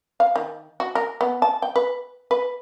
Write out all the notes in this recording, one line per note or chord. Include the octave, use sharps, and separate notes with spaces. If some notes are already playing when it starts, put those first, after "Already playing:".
F5
D#3
F#4
A#4
B3
A5
G5
B4
B4